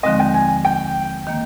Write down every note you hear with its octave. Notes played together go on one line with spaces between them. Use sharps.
D#2 D3 F3 G#3 C4 D#5
G5
G#5
G5
D#3 A#3